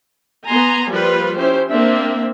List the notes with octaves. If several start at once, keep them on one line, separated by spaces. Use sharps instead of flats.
B3 G#5 A#5 C6
F3 G3 A#3 F4 B4
C#4 E4 G4 C5
A#3 C4 D4 E5